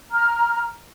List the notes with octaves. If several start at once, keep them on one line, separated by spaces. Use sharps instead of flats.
A#5 F6